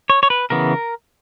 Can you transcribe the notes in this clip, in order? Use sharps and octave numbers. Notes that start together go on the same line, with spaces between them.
C#5
C#5
B4
C#3 E3 B3 A#4